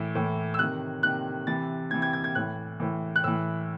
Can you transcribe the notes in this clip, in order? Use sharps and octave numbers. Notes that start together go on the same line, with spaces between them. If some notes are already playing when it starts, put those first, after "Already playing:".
Already playing: A2 E3
A2 E3
E6
C3 D#3 F#6
C3 D#3 F#6
C3 E3 A6
C3 E3 G#6
G#6
G#6
G#6
A2 E3 F#6
A2 E3
F#6
A2 E3 E6